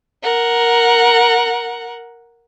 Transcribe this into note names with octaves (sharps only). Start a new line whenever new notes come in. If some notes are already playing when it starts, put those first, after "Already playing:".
A#4 F#5